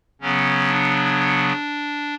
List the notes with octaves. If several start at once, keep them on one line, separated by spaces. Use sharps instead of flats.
C#3 F#3 B3 C#4
D4